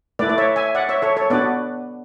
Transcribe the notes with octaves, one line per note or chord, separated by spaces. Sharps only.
A3 E4 B4 D5
D5
C#5 E5
E5 G#5
D5 F#5
C#5 E5
A4 C#5
A4 C#5
B3 D4 F#4 B4 D5